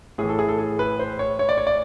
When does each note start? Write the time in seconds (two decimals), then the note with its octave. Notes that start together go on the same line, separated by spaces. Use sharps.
0.18 A2 E3 G#4
0.29 A4
0.39 G#4
0.49 A4
0.58 G#4
0.79 B4
0.99 C5
1.19 C#5
1.39 C#5
1.49 D5
1.57 C#5
1.67 D5